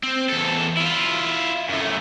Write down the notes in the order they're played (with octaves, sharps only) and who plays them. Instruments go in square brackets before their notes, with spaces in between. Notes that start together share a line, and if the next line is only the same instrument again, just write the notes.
[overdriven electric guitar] C4
E2 A4
E4 F4
F#2 A3